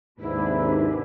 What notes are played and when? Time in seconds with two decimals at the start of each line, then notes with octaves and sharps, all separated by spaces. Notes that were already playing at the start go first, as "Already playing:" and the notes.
0.20 D#2 G#2 C3 D4 E4 B4